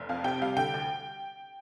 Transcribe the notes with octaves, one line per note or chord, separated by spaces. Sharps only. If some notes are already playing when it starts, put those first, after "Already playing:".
Already playing: F1
F2 F5
C3 G5
G3 F5
D3 G5
D2